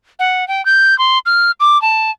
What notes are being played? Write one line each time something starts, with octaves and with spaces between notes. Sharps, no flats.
F#5
G5
G6
C6
F6
D6
A5